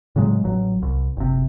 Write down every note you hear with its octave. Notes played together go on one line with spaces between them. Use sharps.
A2 C#3 F#3 G#3
A1 F#3
C2
F#1 C3